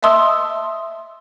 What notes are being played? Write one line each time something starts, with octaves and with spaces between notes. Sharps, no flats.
D#5 E5 A5 C6 D#6 E6